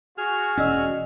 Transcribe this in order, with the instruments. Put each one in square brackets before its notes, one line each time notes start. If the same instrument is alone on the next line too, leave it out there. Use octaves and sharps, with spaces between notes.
[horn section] F#4 [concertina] G#4 F6
[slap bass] E1 C#4 [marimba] D5 D#5 E6